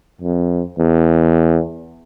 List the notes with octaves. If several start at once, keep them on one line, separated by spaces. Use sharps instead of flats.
F2
E2